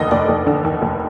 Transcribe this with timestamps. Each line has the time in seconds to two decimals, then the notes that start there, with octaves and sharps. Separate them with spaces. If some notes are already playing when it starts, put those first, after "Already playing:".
Already playing: F1 D#2 D3 D#5
0.11 F1 D5
0.29 F1
0.46 D3
0.64 D#2
0.82 F1